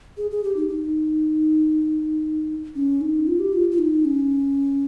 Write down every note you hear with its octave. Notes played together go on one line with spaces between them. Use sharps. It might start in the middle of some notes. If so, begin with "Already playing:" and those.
G#4
G#4
G4
D#4
D#4
C#4
D#4
F4
G4
F4
F4
D#4
C#4